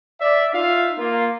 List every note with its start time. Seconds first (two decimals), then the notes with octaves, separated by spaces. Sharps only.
0.21 D5 E5
0.54 D#4 F4 E5 F5
0.97 A#3 F4